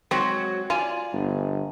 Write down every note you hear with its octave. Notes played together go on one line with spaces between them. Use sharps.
F#3 G#3 C4 F#4
F4 D5 G#5
G1